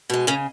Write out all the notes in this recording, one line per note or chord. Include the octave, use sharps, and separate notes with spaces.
B2 G#3
C#3 C#4